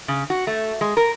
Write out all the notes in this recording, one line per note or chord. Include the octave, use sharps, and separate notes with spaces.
C#3
F#4
A3
G#3
A#4